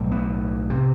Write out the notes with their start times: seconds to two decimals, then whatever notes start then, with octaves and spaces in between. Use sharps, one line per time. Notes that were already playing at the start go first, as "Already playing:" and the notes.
Already playing: B1 A2
0.12 B3
0.70 C3